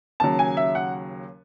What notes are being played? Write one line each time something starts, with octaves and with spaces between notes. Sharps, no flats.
D#2 C#3 F#3 A5
G#5
E5
F#5